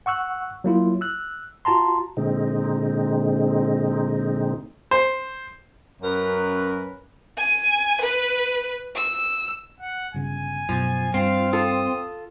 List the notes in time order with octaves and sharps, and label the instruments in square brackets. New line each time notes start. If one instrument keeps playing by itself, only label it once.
[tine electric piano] F#5 C#6 E6 F#6
F#3 A#3 E4 F4
E6 F#6
F4 F#4 A5 A#5 C6
[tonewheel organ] A#2 D3 G#3 C4 D#4
[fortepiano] C5
[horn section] F#2 C#4 A#4 B4
[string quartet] G#5
B4
E6
[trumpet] F#5
[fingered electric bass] G1 C#3 [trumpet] G#5
[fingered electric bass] F#2 B2 [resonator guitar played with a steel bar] F3
[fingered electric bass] G2 [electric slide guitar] C4 [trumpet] F5
[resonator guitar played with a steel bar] F4 A4 [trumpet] D#6